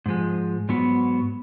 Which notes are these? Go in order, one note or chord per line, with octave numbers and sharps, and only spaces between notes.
G#2 F3 G#3
G#2 F#3 B3 F#4